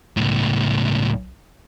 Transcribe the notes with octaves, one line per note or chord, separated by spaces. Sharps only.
C#2 A2